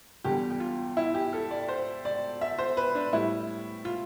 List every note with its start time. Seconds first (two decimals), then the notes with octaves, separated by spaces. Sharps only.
0.24 E2 D3 G3 G4
0.50 G4
0.60 F4
0.97 E4
1.14 G4
1.33 A4
1.51 D5
1.68 C5
2.05 D5
2.41 E5
2.58 C5
2.77 B4
2.95 D4
3.13 A2 G3 E4
3.85 F4